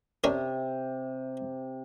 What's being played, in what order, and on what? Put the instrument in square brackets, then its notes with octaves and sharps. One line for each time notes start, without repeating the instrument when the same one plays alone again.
[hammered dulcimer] C3 [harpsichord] C#4 D4 A#4